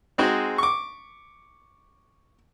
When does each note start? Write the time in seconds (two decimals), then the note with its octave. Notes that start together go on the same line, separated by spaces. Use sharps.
0.18 G#3 C4 D#4 F#4 G#4 C5
0.58 C#6 D6